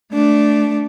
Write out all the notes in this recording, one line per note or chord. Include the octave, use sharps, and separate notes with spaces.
A3 D4